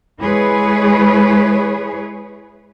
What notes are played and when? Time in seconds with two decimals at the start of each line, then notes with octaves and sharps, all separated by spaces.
0.21 G#3 E4 G#4 B4 C#5